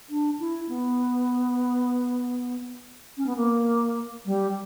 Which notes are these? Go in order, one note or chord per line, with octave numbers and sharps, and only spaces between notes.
D4
E4
B3
C#4
B3
A#3
G3